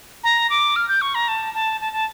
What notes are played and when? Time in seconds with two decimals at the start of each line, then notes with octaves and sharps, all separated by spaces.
0.24 A#5
0.50 D6
0.76 F6
0.88 G6
1.02 C#6
1.15 A#5
1.28 A5
1.54 A5
1.81 A5
1.93 A5